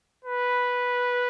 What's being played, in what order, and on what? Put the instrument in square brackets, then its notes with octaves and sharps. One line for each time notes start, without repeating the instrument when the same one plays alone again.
[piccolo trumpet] B4